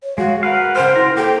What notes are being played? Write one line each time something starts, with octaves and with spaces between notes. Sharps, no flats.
C#5
G#3 F#4 F5
A#4 B4 F5 F#5
C#3 C5 G5 F6
E4 A#4
A#3 A4 G5